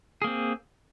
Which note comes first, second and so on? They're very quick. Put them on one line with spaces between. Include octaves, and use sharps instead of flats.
G#4 A#3 C4